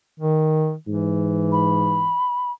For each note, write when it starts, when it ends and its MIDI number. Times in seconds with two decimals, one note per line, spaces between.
0.19 0.75 51
0.88 2.07 44
0.88 2.15 52
1.52 2.51 83